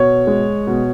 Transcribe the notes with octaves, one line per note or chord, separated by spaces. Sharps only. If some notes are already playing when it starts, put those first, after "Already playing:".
Already playing: B2 C#5
G#3
B2